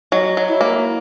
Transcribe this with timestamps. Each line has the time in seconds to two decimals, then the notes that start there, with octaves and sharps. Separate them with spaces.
0.12 F#3 D#5
0.37 F#3
0.48 E4
0.61 A#3